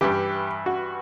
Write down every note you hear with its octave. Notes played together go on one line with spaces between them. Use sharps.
G2 E3 G4
F#4